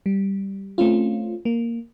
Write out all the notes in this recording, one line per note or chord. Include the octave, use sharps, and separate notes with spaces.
G3
A3 C4 C#4 F4
A#3